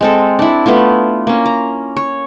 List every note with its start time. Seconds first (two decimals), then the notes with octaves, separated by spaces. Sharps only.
0.01 G#3 C4 A4
0.39 D4 E4
0.66 A3 B3 E4 F4
1.27 A#3 C#4
1.46 A#5
1.96 C#5